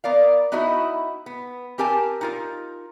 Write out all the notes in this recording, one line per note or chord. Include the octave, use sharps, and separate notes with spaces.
B3 A#4 D5 F5
B3 D#4 E4 F#4 D#5
B3
C4 G4 A#4 G#5 A5
D#4 F4 A#4